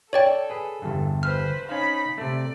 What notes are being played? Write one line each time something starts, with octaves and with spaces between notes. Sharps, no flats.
A4 C#5 D5 G5
G#4 B4
G1 E2 G2
B4 C5 F6
C#4 D#4 C5 F5 B5
C3 A3 D5